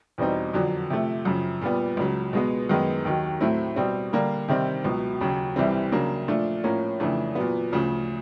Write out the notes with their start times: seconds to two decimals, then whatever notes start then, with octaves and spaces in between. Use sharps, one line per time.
0.18 E2 B2 G3 C4 D#4
0.54 F2 D3 F#3
0.90 C3 F3 A3
1.25 F#2 C#3 F3
1.61 A#2 G3 B3
1.97 C#2 C#3 F#3
2.33 B2 G#3 B3
2.69 F#2 D#3 G#3 B3
3.05 D#2 D#3 F#3
3.41 A2 F#3 A3 C4 E4
3.76 B2 G3 C4
4.13 D3 G3 A#3
4.48 C3 D#3 G3 C4
4.84 C#2 B2 F#3
5.21 D#2 C#3 F#3
5.56 C2 C3 E3 G3 C4
5.92 C#3 F#3 A#3 D4
6.28 A#2 F3 A3 D4 F4
6.64 A2 F3 A#3 C#4
7.00 F2 C#3 E3 A3 D4
7.35 A#2 F#3 B3
7.71 D2 C#3 F3